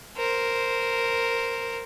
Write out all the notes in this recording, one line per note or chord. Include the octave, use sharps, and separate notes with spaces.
A#4 C5